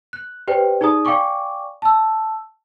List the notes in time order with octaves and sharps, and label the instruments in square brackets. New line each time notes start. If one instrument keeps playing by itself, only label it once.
[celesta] F#6
G4 B4 C5 D5 G5
D#4 G#4 D5 A#5 D#6
D5 F5 G5 G#5 C#6 D6
A5 E6